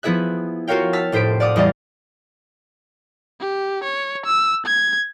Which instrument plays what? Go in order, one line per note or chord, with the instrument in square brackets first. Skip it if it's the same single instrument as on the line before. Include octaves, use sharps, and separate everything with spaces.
[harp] F3 B3 E4 G#4 E5 F#6
F4 F#4 A#4 C#5 F5 G5
A5 E6 F6 A6 B6
F1 A2 C5 B6 D7
D5 F5 F#5 D6 D#6
E2 G3 D#5 F5 A5
[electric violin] G4
C#5
E6
G#6